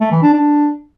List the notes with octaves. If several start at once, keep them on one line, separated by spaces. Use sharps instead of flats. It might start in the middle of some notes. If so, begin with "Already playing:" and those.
A3
E3
D4
D4